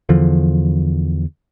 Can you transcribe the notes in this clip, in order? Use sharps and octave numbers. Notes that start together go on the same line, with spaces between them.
E2 D3 F3